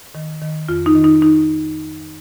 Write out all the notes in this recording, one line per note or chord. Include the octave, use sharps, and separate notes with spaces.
D#3
D#3
F2 F4
D#4
D#3
D#4
D#3 D#4